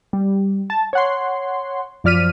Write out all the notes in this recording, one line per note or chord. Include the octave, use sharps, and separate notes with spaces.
G3
A5
C#5 F#5 C6
F#2 F3 D5 F6 B6 D#7